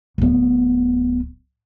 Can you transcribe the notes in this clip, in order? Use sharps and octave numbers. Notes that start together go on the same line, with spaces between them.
D1 B3